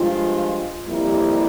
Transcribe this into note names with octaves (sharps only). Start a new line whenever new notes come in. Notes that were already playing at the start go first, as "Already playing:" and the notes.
Already playing: G2 F3 G#3 F4
F2 C3 G3 A#3 E4